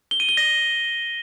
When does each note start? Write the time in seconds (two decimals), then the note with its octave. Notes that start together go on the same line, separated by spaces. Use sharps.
0.11 G7
0.20 D#7
0.29 G7
0.37 A#6